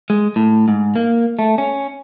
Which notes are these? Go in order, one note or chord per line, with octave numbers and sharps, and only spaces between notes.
G#3
A2
G#2
A#3
A3
C#4